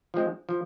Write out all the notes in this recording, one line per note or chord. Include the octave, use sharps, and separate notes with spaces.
F3 G#3 C4
F3